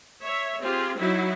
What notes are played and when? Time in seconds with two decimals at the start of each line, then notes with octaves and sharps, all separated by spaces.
0.23 C#5 E5
0.61 C4 F4 G4 G#4
0.99 F#3 D#4 E4 F#4